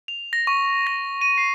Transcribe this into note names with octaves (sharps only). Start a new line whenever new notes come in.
F7
A#6
C#6
A#6
D#7
C7